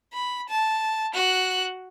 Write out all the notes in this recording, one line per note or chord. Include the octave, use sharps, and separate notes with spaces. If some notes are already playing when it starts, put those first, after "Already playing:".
B5
A5
F#4 F#6